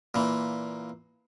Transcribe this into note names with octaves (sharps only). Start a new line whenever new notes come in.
A#2 E3